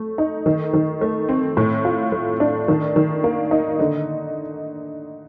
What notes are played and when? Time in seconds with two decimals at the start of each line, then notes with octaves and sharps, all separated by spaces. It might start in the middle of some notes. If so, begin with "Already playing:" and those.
Already playing: A3
0.18 D#4
0.46 D#3
0.73 D#3
1.01 A3
1.29 C4
1.57 A2
1.85 F4
2.12 A3
2.40 D4
2.68 D#3
2.96 D#3
3.24 A#3
3.51 D#4
3.79 D3